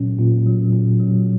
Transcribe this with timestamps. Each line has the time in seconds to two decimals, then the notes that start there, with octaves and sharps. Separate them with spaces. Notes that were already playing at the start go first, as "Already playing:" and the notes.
Already playing: A#2 F#3 C#4
0.18 A#2
0.47 F#3
0.73 A#2
1.00 F#3